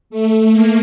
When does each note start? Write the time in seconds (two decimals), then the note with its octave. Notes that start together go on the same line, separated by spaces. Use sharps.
0.10 A3
0.51 A#3